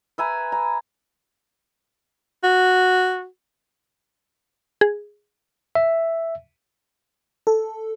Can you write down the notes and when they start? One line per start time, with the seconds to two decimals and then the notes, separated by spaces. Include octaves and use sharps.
0.18 B4 E5 G#5 A#5
0.52 A#5
2.44 F#4
4.81 G#4
5.75 E5
7.47 A4